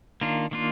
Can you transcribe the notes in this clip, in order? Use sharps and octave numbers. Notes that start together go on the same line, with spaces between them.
D#3 A#3 D4 F4
D#3 A#3 D4 F4